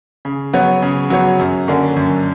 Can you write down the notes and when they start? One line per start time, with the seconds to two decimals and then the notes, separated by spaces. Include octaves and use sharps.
0.25 C#3
0.53 F#3 B3 F#4 C#5
0.82 C#3
1.10 F#3 B3 F#4 C#5
1.39 F#2
1.68 D3 A#3 C#4
1.96 F#2